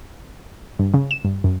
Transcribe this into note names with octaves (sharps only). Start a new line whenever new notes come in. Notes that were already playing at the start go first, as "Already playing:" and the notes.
G2
C#3
E7
G2
F#2